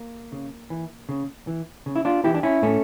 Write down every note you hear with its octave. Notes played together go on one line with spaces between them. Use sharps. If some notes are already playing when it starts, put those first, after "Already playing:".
Already playing: A#3
C#3
E3
C#3
E3
C#3
E4
D4 F4
E3 E4 G4
D4
C#4 E4
A2 A3 C#4